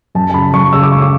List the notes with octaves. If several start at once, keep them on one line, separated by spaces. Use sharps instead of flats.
F#2 A5
A5
C#3 B5
F#2 C#6
C#3 E6
D6
G#3 C#6
D6